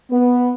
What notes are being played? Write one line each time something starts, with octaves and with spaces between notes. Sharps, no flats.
B3